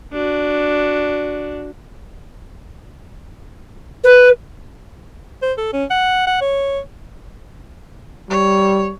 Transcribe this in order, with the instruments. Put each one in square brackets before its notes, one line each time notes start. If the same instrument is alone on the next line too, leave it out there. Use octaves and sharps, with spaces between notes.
[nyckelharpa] D4 F#4
[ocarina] B4
[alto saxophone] C5
A4
C#4
F#5
F#5
C#5
[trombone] G3 [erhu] C#5